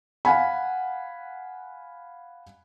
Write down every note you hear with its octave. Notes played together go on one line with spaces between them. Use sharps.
F5 F#5 G#5 B5